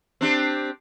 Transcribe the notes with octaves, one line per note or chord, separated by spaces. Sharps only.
C4 D4 G4